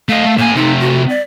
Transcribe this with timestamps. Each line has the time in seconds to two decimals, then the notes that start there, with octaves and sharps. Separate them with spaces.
0.09 A3 D#5 F5
0.25 A3
0.38 A2 A#3 G#5
0.56 C3 A3 D#4
0.80 F#4
1.09 D5